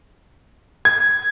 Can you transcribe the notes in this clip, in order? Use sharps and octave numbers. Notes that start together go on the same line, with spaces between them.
G#6